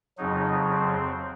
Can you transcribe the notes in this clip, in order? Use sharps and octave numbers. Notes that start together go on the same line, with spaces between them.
F2 C#3 F#3 D#4
C4